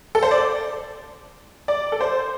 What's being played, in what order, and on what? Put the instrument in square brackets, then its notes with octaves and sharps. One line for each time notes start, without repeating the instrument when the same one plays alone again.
[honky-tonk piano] A4
C5
D5
D5
A4
C5